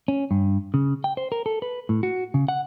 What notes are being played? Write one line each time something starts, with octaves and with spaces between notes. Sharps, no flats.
C#4
G2
C#3
G5
C5
A#4
A4
B4
A2
F#4
C#3
F#5